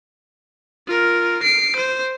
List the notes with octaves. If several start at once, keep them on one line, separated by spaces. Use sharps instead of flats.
F4 A#4
C7 D7
C5